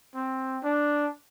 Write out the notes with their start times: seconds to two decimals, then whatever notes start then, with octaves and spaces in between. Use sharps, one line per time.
0.15 C4
0.63 D4